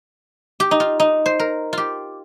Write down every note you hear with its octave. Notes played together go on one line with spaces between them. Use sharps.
G4
D#4
F4
D#4
C5
A#4
F4 G4